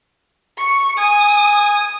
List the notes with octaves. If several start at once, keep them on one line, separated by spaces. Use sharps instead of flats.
C#6
G#5 D#6